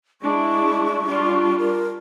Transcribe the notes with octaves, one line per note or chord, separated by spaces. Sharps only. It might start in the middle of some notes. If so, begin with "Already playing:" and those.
G#3 D4 E4 C#6
G3 D4 F4
A#4